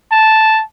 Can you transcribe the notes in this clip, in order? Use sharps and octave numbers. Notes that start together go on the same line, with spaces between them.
A5